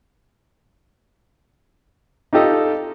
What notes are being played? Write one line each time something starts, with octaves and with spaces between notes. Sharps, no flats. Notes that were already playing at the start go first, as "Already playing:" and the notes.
D#4 F4 G4 A4 D#5